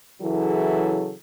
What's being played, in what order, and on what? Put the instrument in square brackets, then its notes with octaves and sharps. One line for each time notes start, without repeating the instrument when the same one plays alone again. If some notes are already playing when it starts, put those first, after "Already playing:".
[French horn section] C#3 E3 F#3 E4 G#4 A4